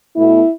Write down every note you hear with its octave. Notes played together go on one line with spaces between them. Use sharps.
B2 A3 E4